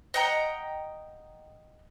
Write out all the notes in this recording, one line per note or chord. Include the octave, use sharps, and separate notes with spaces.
D#5 F#5 G5 A#5